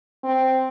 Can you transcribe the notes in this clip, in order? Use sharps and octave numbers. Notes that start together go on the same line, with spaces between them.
C4